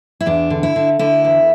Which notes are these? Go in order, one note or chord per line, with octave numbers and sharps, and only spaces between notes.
E4
E2 D4
D3
E4
D3
D3 E4
E2